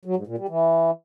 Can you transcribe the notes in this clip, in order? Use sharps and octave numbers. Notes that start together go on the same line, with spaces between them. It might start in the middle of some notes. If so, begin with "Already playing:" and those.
F#3
G#2
A#2
G3
E3